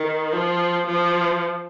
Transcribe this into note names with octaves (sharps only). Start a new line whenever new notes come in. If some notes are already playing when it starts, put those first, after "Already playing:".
Already playing: D#3
F3
F3